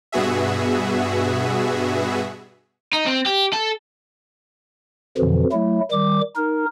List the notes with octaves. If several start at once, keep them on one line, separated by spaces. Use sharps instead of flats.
G2 B2 B3 F#4 G#4 E5
D#4
C4
G4
A4
F2 B2 D3 E3 F3
F#3 A3 E4
D#3 G3 D6
D#4 A#4